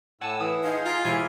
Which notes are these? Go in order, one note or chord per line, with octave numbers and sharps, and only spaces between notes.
A2 F#5 G#5 A5 E6
E3 D#6
D#4 G#4 F5 C6
F4 A#5
E1 E4 G4 G#4 G#5